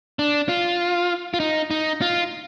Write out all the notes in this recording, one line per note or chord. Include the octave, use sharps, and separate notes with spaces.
D4
F4
F4
D#4
D#4
F4